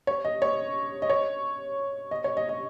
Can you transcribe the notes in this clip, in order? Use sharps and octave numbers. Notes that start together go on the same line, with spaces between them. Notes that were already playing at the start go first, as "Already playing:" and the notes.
C#5
D#5
C#5
D#5
C#5
D#5
C#5
D#5
D#5